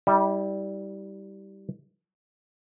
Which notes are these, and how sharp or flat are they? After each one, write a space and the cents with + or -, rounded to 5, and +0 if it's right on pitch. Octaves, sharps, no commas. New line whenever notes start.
G3 -5 E4 -40